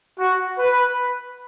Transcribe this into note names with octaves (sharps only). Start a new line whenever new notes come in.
F#4
B4